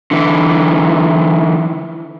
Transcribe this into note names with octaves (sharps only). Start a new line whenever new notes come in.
D3 E3